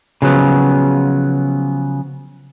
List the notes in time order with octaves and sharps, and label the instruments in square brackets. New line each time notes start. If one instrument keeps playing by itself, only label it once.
[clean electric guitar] C#3 F3 F#3 B3